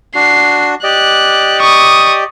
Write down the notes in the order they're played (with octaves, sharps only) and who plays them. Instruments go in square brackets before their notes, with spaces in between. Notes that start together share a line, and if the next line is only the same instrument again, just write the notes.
[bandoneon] D4 F#4 [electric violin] C7
[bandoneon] G4 D5 D#5 [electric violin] F#6
[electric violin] C#6 D#6